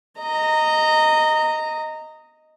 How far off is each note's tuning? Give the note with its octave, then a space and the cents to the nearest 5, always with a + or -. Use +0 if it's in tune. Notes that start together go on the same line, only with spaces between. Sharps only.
D#5 +0 A#5 -20